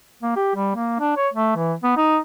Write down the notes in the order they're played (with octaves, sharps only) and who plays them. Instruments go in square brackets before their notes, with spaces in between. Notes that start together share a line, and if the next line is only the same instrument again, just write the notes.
[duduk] A#3
G4
G3
A#3
D4
C#5
A3
E3
B3
D#4